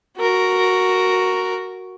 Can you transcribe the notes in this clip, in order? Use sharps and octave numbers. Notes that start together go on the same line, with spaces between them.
F#4 A#4